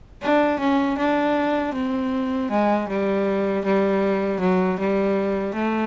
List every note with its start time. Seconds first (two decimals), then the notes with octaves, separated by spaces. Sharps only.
0.22 D4
0.59 C#4
0.98 D4
1.74 C4
2.50 G#3
2.88 G3
3.65 G3
4.40 F#3
4.79 G3
5.54 A3